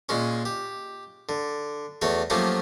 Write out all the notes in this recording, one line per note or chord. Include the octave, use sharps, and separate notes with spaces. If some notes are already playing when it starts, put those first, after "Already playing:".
A#2 G#3 C#4
G4
D3
E2 A3 F#4 C#5
F3 F#3 A3 A#3 C#4 G4